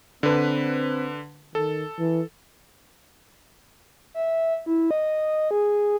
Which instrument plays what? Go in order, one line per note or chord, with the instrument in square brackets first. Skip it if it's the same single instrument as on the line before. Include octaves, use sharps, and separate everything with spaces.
[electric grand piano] D3 B4 [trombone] C4
[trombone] D#3 [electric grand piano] A4
[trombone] E3
[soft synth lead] E5
E4
D#5
G#4